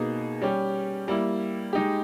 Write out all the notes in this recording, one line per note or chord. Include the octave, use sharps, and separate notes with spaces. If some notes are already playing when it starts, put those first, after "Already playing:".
Already playing: B2 A#3 D#4 G#4
G3 C#4 G4
G3 A#3 E4
G#3 D#4 G4